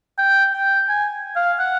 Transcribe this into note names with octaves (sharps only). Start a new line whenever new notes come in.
G5
G5
G#5
F5
F#5